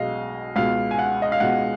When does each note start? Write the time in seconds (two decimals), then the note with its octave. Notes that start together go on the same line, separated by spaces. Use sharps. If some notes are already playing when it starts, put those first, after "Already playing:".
Already playing: B1 B2 G#3 D#5 F5
0.56 C#2 B2 G#3 F5
0.91 G#5
0.99 F#5
1.22 D#5
1.32 F5
1.40 C#2 B2 G#3 F#5